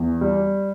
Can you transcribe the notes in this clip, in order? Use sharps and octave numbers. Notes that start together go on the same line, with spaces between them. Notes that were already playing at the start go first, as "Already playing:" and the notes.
Already playing: E2
G3